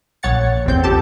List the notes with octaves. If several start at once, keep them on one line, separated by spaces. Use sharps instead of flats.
A#1 C#5 F#5 A6 C#7
A1 E2 C4 G6
C#2 G4 A4 A5